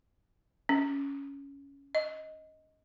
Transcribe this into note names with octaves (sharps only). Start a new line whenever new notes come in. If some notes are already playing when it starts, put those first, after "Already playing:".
C#4
D#5